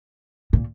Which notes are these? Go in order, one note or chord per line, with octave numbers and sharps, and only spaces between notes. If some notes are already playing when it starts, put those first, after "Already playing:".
A#2